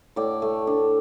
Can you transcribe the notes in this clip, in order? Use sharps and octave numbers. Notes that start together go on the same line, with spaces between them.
A2 D5 G5
A3
D4